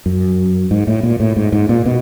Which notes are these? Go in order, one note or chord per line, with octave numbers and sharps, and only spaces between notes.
F#2
G#2
A2
A#2
A2
G#2
G#2
A#2
B2